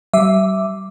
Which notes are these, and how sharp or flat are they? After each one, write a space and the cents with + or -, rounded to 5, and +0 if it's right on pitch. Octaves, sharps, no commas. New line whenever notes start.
G3 -40 E5 +0 D6 +0